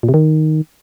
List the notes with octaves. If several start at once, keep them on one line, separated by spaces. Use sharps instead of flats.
A#2
C3
D#3